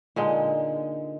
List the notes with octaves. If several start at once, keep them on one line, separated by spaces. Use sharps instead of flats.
A#2 D3 G#3 D#4